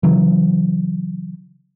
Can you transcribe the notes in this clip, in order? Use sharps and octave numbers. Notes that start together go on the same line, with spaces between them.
C#3 E3 F#3